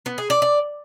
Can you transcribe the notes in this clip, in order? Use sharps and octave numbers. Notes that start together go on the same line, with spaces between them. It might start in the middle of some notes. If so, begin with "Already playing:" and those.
B3
G#4
D5
D5